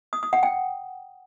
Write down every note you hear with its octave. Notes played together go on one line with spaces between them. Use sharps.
D#6
D#6
F#5
G5